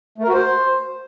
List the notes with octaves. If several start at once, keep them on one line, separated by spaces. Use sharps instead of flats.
A3
A#4
F#4
C5